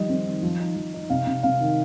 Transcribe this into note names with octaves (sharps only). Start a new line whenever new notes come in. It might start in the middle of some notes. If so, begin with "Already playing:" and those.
Already playing: D#3 F3 G3 D#5
C4
D#3
F3
D#4
F3
D#4
C3 F5
C3
C3 F5
D#3